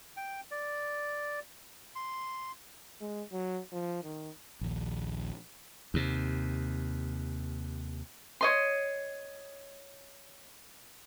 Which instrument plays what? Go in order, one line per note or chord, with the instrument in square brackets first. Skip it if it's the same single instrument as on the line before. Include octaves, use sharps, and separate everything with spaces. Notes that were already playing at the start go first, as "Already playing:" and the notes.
[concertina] G5
D5
C6
[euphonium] G#3
F#3
F3
D#3
[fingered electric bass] A#1 D#2
[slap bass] D#2 C3
[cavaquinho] C#5 D#5 C6